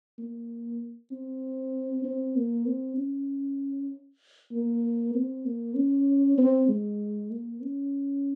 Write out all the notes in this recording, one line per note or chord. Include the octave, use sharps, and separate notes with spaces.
A#3
C4
C4
A#3
C4
C#4
A#3
C4
A#3
C#4
C4
G#3
A#3
C#4